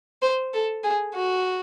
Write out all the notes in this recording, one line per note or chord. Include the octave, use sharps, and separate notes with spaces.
C5
A4
G#4
F#4